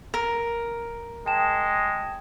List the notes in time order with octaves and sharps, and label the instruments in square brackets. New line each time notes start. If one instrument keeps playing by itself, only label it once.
[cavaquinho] A#4
[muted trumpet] G#3 [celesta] G5 A5 E7